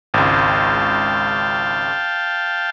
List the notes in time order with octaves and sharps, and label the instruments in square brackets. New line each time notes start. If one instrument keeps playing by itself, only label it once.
[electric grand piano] G#1 C#2 [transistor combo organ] F5 G5 A5